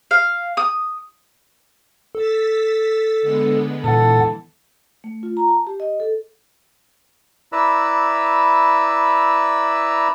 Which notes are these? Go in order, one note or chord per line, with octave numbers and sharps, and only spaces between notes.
F5
D#6
A4 E6 A6 B6
D3 G#3 B3
A#2 E3 A4 F#5
A3
F4
A#5
A5
G4
D#5
A4
E4 B4 D5 A#5 B5 E6